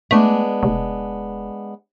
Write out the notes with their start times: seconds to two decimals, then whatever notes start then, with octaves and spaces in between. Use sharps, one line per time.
0.11 G#3 A3 B3 D4
0.63 F1